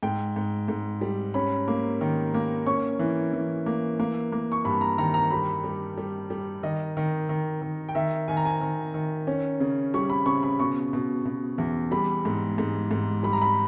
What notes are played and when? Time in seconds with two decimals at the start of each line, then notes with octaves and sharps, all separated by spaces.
0.03 G#2 G5
0.36 G#2
0.68 G#2
1.01 G3
1.34 C#4 B5
1.68 A#3
2.01 D#3
2.34 A#3
2.66 C#4 C#6
2.99 E3
3.33 E3
3.66 A#3
4.00 A#3
4.32 A#3
4.52 C#6
4.65 G2 B5
4.81 A#5
4.98 D#3 A#5
5.14 A#5
5.31 G3 B5
5.64 G3
5.98 G3
6.30 G3
6.63 D#3 D#5
6.97 D#3
7.29 D#3
7.62 D#3
7.89 G5
7.95 D#3 E5
8.28 D#3 G#5
8.37 A#5
8.45 G#5
8.61 D#3
8.94 D#3
9.27 C#4
9.60 C#3
9.94 G3 C#6
10.10 B5
10.26 C#3 C#6
10.43 B5
10.59 B2 C#6
10.93 B2
11.25 B2
11.58 E2
11.91 G3 B5
12.25 G#2
12.58 G#2
12.91 G#2
13.23 G3 B5
13.33 A#5
13.42 B5